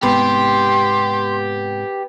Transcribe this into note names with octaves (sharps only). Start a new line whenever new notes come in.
G#2 C3 B3 G4 B5 C6